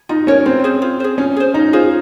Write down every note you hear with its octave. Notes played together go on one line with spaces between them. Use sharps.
D#4 F4
C#4 A#4 C#5
C4 F4
G#4 C5
F4
G#4 C5
C#4 F4
G#4 C5
D#4 F4
F4 G#4 C5